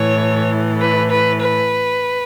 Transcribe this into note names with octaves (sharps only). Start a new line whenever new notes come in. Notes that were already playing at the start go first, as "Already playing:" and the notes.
Already playing: A2 E3 C#5
B4
B4
B4